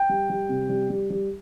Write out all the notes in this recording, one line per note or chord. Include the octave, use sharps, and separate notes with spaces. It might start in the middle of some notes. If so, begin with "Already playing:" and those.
Already playing: G5
G3
G3
C3
G3
G3
G3